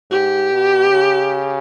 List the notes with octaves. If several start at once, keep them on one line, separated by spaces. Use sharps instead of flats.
G#2 G4
B2
C#3